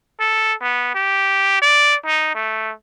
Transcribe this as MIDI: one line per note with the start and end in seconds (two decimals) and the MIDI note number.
0.20 0.54 69
0.61 0.92 59
0.95 1.59 67
1.62 1.96 74
2.06 2.30 63
2.35 2.73 57